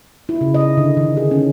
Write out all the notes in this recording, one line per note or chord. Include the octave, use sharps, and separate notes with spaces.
E4
C#3
D#5
D3
D#3
G#4
C#4